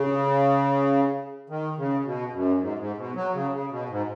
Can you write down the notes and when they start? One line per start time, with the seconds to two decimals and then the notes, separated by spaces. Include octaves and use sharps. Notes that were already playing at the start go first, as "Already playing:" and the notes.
Already playing: C#3
1.50 D#3
1.78 C#3
2.05 B2
2.33 F#2
2.61 G#2
2.79 G#2
2.98 B2
3.15 F#3
3.34 C#3
3.53 C#3
3.71 B2
3.89 G#2